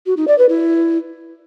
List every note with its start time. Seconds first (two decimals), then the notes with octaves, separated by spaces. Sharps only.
0.06 F#4
0.17 D#4
0.28 D5
0.38 B4
0.49 E4